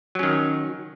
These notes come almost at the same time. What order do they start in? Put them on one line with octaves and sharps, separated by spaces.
F#3 C#4 D#3